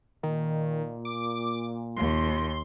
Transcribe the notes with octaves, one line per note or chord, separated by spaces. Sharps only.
A#2 D#3
D6
D#2 C6